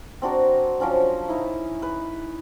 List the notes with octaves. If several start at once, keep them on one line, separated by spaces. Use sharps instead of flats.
C4 D4 F#4 A#4
F3 F#3 C#4 D4
D#4 E4
B4